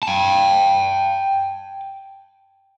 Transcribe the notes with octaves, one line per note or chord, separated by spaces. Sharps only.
G5 A5